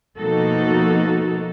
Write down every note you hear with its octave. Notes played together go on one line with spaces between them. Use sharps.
B2 F3 A#3 D#4 F#4 A4